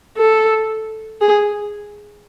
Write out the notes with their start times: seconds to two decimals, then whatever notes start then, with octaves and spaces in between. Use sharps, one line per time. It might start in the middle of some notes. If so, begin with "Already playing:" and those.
0.17 A4
1.21 G#4